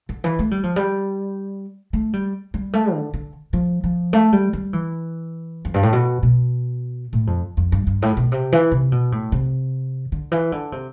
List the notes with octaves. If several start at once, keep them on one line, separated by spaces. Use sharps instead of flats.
D3
E3
A3
G3
F3
G3
A3
G3
G3
A3
D3
D3
F3
F3
A3
G3
G3
E3
F2
G2
A2
B2
B2
A2
F2
F2
G2
G2
A2
B2
C3
E3
C3
B2
A2
C3
D3
E3
D3
C3